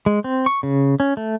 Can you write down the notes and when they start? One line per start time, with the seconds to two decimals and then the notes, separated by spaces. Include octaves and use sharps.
0.06 G#3
0.24 C4
0.46 C#6
0.63 C#3
1.00 C#4
1.17 A3